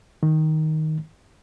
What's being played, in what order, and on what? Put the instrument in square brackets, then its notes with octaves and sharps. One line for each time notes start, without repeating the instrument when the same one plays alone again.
[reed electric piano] D#3